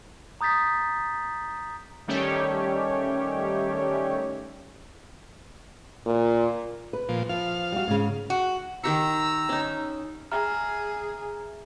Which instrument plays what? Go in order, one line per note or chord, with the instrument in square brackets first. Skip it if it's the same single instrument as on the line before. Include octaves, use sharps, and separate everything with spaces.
[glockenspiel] A#5 D#6 G6 A6 B6
[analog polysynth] D#3 G3 A3 C#4 G4 C#5
[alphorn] A#2
[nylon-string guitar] B4
[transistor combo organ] A#2 F3
[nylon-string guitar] F3 [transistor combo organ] F5
[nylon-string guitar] G3 F#4
G#2 C#3
[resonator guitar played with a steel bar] F#4
[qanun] D#3 G4 C#6 [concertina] A#5 E6
[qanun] C#4 D#4
[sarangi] G#4 [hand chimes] E5 A#5 F6